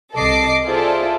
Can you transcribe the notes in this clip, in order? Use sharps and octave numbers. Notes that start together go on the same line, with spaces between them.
C2 A4 D#5 D6 C7
F4 G#4 A4 C5 D5 E5